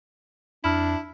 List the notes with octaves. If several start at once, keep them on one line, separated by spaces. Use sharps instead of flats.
F2 D4 E4 B5 E6 F6